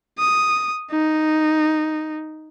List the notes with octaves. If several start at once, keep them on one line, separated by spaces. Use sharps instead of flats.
D#6
D#4